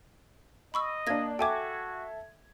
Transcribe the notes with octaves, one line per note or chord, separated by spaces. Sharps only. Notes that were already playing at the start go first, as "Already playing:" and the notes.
D#5 B5 C#6 E6
A#3 D4 G#6 A#6
F#4 A4 E5 G5 G#5 D6 G#6